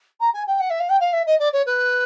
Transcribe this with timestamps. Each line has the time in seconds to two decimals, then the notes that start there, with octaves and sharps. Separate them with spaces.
0.21 A#5
0.34 G#5
0.47 G5
0.60 F#5
0.70 E5
0.80 F5
0.90 G5
1.01 F5
1.13 E5
1.27 D#5
1.40 D5
1.53 C#5
1.66 B4